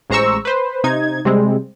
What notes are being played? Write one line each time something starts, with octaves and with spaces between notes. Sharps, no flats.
A1 G#3 C5 A#5 C#6 E6
B4 C5
C3 D#4 G#6
C3 G3 G#3 C4